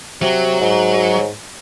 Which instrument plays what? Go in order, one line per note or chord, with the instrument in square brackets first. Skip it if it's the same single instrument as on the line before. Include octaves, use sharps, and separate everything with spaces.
[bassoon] C3 [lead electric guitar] F#3
[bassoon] G#2